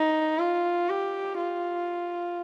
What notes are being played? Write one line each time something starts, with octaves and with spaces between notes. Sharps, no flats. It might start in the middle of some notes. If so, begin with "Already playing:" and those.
Already playing: D#4
F4
G4
F4